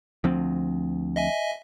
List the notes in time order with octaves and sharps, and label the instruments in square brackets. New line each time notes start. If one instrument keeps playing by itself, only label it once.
[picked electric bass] D2 F3 C4
[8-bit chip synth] D#5 E5 G#5